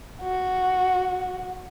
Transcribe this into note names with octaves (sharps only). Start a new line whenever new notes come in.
F#4